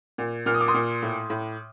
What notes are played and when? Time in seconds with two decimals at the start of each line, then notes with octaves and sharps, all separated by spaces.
0.18 A#2
0.46 A#2 F6
0.54 D#6
0.61 D6
0.68 C6 D#6
0.74 A#2
1.02 A2
1.30 A2